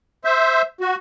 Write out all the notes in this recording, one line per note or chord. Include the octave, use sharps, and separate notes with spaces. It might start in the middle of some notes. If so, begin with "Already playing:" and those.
C5 E5
F#4